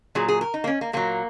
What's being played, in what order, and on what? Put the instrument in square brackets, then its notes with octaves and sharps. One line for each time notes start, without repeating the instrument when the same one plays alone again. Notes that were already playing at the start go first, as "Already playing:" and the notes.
[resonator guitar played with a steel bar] A#2 F#3 G#4
G#4
A#4
D#4
A#3
C#4
A#3
A#2 F#3 A#3